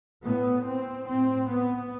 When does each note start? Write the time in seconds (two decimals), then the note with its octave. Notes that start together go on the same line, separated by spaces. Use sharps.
0.24 A2 B3
0.65 C4
1.06 A2 C4
1.48 B3